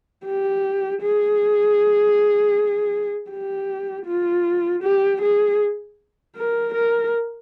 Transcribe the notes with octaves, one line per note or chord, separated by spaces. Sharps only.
G4
G#4
G4
F4
G4
G#4
A#4
A#4